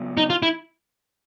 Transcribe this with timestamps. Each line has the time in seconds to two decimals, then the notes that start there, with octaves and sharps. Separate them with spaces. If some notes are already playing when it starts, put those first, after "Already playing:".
Already playing: C#3 F#3 B3 D4
0.17 D#4
0.30 F4
0.43 E4